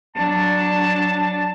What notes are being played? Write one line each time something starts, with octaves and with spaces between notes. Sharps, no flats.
F#3 D4 A5